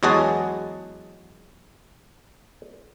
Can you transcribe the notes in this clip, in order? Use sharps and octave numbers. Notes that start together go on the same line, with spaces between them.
E2 F#3 G#3 F#4 G#4 A5